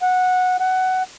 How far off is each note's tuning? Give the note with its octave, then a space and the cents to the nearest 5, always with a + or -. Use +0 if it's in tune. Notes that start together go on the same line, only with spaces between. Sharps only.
F#5 -10
F#5 +15